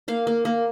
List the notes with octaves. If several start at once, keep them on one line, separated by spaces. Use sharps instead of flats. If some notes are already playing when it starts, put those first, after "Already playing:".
A#3 F5
A#3
A#3